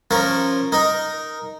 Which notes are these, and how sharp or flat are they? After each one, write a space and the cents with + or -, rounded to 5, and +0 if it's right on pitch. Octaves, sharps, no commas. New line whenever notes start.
F3 +0 C#4 -15 A#4 +0
D#4 +0 A#4 +0